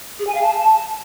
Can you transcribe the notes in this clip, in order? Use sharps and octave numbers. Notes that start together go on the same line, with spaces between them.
G#4
G#5
F5
A5